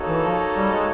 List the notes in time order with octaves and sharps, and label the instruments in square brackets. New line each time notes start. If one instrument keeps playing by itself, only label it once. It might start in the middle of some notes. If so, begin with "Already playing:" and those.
Already playing: [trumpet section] A#3 D#4 F#4 A4 C#5
[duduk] E3
F3
G3
G#3